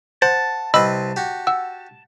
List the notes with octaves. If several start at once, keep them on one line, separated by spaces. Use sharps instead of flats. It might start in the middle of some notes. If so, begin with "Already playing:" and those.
C5 F#5 A5
C2 C4 B4 D#5 B5 E6
F#4 G4
F#5 E6